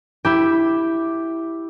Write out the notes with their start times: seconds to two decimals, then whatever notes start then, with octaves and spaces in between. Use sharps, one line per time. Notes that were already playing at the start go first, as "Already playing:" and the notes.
0.25 E4 G4